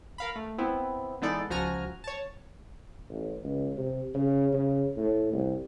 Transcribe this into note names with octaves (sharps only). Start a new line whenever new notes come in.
A#4 F5 B5
A3
B3 C4 E4
E3 G#3 B3 D#4 A4 D5
C#2 F3 F#4 G#5 A#5 F6
C#5 A5
A1
C#2
C3
C#3
C#3
A2
C2